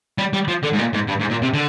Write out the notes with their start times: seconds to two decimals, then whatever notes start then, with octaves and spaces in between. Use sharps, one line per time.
0.18 G3
0.33 G3
0.48 F3
0.63 D3
0.73 G#2
0.79 A#2
0.94 G#2
1.08 G2
1.20 G#2
1.30 A#2
1.42 C3
1.54 D3